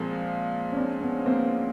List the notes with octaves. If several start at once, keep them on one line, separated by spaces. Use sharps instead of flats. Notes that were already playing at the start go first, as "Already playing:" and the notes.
Already playing: A#2 F3 G#3 A#3 C4
C#4
C4 D4
B3 C#4
A#3 C4